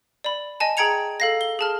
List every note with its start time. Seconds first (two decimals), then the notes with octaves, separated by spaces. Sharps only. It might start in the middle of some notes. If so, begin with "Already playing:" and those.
0.24 D5 B5
0.60 D#5 G#5 A5
0.77 G#4 G5 A#5 G#6 C#7 F7
1.20 A4 F5 A#6
1.41 G7
1.59 G#4 A5 F6